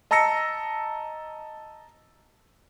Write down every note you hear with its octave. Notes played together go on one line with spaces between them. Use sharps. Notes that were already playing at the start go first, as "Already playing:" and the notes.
D#5 A5 A#5 E6 A#6 C#7